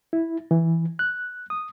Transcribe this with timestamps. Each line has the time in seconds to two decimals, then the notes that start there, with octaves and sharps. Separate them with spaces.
0.13 E4
0.51 E3
0.99 F#6
1.50 D#6